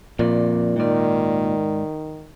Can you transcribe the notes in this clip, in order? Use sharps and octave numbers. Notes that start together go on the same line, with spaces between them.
F2 A#2 D5
G#2 D#3 D5